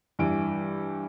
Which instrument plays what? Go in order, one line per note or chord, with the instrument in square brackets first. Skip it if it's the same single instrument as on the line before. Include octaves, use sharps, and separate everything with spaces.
[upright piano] G2 E3 D7